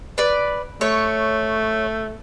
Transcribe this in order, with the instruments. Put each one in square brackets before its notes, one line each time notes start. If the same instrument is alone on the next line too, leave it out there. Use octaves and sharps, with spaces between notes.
[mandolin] B4 D5
[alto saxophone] A3 [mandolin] C#5